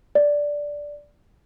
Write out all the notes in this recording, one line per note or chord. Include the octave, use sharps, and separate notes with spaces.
D5